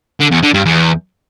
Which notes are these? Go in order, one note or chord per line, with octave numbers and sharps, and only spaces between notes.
D3
E2
D3
G2
E2